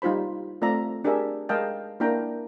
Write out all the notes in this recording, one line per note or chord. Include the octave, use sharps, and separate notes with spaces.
G3 D#4 F4 C5 B5
A3 C4 F4 D5 E5 A#5
D4 G4 G#4 A#4 E5
G#3 A#4 D#5 F5 G5 A5
A#3 D4 E4 A#4 G5 A#5